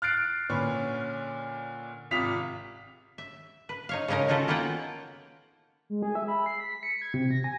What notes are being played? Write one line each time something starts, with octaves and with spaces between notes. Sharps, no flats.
F6 F#6 A6 C7 D7
A#2 D3 C#4 B4 C#6
G#1 C3 F4 D#6 B6 F7
E5
B4
D#4 C#5 F5
C#3 G#3 C#4 D#4 A#4
C#4 D#4 F4 F#4 A4 B4
A#3 B3 F4 A#4 F#5 G5
G#3
G#4
E5
B5
C7
B6
C#7
G#6
C3
A#6
G#5